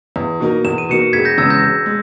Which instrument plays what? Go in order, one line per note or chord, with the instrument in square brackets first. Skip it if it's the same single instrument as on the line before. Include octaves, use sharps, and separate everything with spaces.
[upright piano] E2
B2 A#3 D#4 A#4
[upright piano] E2 [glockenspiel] E7
[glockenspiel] D#7
[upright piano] B2 A#3 D#4 A#4 [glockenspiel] C#7 E7
[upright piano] E1 [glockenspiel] G#6 B6
[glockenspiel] G6 A#6
[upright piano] E2 C#3 G#3 [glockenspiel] E6 G#6
[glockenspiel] G6 A#6
[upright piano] E1
G#3